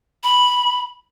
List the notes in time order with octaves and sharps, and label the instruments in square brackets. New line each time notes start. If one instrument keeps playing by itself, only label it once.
[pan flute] B5